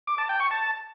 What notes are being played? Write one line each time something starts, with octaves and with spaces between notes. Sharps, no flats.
D6
A5
G5
C#6
A5